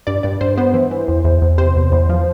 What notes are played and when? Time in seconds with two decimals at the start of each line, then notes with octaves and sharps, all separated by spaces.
0.07 G2 D5
0.23 G2 D5
0.41 G2 C5
0.57 B3 C5
0.74 E3
0.91 E3
1.08 E2
1.24 E2
1.42 E2
1.58 C3 C5
1.76 E2
1.92 E2
2.09 F3